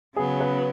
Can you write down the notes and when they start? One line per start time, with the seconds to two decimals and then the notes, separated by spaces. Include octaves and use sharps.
0.16 C#3 F#3 B3 G#4
0.40 B4